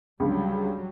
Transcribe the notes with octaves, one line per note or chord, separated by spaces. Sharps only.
C#2 D3 F#3 G3 G#4